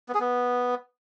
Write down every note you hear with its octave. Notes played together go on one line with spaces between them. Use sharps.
B3
G#4
B3